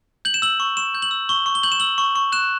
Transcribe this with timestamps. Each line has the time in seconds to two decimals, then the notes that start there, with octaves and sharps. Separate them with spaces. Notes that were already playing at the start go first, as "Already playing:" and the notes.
0.25 G6 F#7
0.34 E7
0.42 E6 F#7
0.60 C#6
0.77 C#6 E7
0.95 G6
1.02 F#7
1.11 E6
1.29 C#6 G7
1.46 C#6
1.55 G7
1.63 G6 F#7
1.72 E7
1.80 E6 F#7
1.98 C#6
2.16 C#6
2.32 F#6 E7